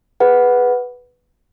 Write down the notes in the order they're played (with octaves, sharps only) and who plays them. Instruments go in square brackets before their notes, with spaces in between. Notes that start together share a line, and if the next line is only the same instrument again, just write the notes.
[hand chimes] G#4 B4 F#5